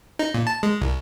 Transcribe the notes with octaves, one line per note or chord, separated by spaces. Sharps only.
D#4
A#2
A5
G#3
C2